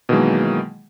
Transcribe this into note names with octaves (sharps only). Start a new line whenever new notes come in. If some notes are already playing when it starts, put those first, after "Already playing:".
B2 D#3 E3 F#3 G#3 A#3